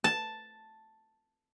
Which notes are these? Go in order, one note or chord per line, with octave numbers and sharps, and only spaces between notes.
A5